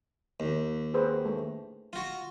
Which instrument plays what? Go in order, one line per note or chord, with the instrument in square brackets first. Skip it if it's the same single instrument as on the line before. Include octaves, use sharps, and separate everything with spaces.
[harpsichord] D#2
[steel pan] G#4 B4 C5
A3
[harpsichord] F4 F#4